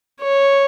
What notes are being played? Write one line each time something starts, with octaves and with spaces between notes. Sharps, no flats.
C#5